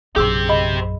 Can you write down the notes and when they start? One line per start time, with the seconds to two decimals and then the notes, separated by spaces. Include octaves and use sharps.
0.16 A#1 F#2 G4 G#4 C5 E6
0.49 D#5 B5